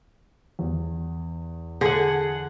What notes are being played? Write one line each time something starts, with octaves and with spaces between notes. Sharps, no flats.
E2
D3 G#4 F#5